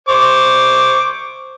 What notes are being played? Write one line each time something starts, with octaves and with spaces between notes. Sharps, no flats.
C5 C#6 D6